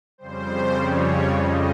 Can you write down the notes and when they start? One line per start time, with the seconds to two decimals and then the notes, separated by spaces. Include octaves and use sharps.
0.18 F2 C#3 G3 C5
0.72 C#5
1.27 D#5